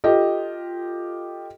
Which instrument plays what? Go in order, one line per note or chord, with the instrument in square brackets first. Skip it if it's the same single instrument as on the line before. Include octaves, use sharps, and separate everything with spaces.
[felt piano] F4 G4 A4 D#5